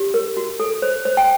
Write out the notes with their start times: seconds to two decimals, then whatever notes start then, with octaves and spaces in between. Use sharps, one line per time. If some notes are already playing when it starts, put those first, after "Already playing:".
Already playing: G4
0.14 A#4
0.37 F#4
0.60 A4
0.82 C5
1.05 C5
1.17 G5